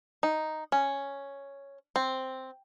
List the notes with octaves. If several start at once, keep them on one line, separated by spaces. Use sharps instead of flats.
D#4
C#4
C4